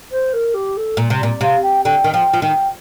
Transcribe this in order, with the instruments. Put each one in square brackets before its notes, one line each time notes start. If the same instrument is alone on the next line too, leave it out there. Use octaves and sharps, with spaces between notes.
[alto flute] C5
A#4
G4
A4
[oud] A#2
C3
[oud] A#2 [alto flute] D5
[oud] C3 [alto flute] F5
[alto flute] G5
[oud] D3 [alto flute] G5
[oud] D#3
[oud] F3 [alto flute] G5
[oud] F3
[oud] D#3 [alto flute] G5